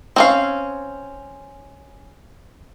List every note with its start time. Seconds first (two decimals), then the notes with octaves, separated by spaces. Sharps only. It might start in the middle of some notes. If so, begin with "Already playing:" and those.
0.16 C4 C#4 F5